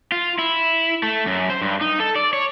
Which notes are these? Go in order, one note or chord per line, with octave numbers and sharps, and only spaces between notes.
F4
E4
A3
F#2
C5
G2
D#4
A4
D5
C#5